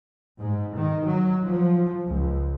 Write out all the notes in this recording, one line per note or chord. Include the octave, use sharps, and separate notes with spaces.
G#2
D#3
F#3
F3
C#2